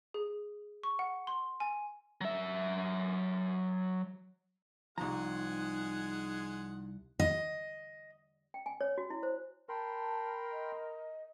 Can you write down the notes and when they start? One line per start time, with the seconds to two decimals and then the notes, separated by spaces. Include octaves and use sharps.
0.14 G#4
0.84 C#6
0.99 F#5
1.27 C6
1.60 G#5
2.21 F#3 E5
4.98 C2 F3 G#3 D#4 G#4 F#5 A#5
7.19 D#5
8.54 G5
8.66 G#5
8.81 C#5
8.98 F#4
9.10 E4
9.23 C5
9.69 A#4 G5 A5 B5 C6
10.52 D#5